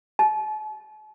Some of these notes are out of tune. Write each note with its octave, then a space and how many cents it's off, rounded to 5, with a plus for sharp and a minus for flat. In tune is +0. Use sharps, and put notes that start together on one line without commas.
A5 -45